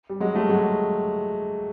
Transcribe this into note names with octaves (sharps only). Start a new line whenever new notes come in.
G3
F#3 G#3
G3 A3
F#3 G#3